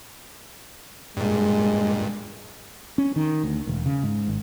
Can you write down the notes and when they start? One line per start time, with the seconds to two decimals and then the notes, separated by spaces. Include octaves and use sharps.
1.17 G2 A#2 G#3
2.98 C#4
3.16 D#3
3.43 D2
3.67 E1
3.86 C#3
4.03 G#2
4.28 G#1